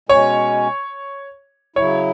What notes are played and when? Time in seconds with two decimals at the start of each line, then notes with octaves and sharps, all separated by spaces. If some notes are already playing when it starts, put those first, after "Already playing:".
0.09 B2 G#3 C#4 C#5
1.76 C#3 F#3 E4 C#5